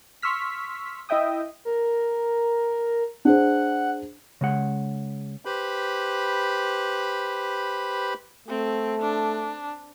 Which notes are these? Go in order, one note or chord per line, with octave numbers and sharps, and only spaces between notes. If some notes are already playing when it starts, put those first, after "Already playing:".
C6 C#6 E6 F6 B6
E4 D#5 E5 G5 D#6
A#4
D4 G#4 C5 F#5
C#3 G#3 F#5
G4 B4 C5 B5
A3 C4
D4